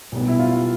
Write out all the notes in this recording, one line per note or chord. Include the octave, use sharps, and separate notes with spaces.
B1 B2 G3 B3
E4
F4